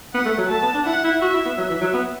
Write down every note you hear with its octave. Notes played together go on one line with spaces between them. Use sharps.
B3 F#5
A3
F#3
A3 A5
B3
D4
E4 F#5
E4
F#4 E5
E4
B3
F#3 E5
E3
F#3
B3